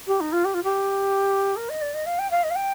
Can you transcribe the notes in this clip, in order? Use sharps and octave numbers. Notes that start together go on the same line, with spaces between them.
G4
D#4
F4
G4
F4
G4
A#4
D#5
D5
D#5
F5
G5
F5
D#5
F5
G5